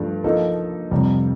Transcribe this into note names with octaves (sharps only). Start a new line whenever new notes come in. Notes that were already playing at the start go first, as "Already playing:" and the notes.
Already playing: G2 F3 A3 D4 G4
F3 A#3 D#4 A4
F2 C3 G3